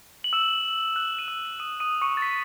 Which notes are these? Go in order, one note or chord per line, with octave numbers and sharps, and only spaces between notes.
F#7
E6 E7
F#6 F#7
D#7
E6 E7
F#7
E7
D#6 D#7
D#6 D#7
C#6 C#7
A6
B6